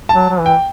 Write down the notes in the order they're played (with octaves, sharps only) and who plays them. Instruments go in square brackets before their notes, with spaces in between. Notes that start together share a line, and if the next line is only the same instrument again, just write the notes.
[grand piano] A5
[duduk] F#3
F#3
E3
[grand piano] G5